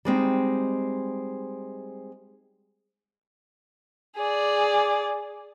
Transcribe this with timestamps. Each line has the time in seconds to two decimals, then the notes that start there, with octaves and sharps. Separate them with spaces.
0.05 G3 G#3 C4 D#4
4.17 G#4 D5